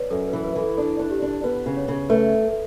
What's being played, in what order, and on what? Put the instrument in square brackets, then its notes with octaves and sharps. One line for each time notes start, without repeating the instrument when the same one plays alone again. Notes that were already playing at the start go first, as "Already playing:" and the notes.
Already playing: [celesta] B4 C#5 D5
[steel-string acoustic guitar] F#2 [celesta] A4
[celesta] B4
[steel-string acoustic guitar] E3
[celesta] B4
[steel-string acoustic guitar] E3
[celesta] A4
[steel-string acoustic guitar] D4 [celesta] A4
[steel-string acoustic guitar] D4
[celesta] G4
[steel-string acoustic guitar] D4
[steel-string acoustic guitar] B3 [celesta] B4
[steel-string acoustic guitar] C#3
[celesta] C#5
[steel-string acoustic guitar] C#3
[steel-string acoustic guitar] A3 [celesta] B4